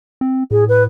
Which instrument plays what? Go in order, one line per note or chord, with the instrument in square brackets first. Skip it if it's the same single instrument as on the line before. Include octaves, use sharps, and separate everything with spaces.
[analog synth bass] C4
[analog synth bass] A2 [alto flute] G#4
[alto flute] B4